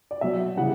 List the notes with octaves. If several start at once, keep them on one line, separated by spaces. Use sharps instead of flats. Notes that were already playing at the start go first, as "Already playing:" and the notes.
D5
B2 F#3 E5
C#3 E3 G3 F#5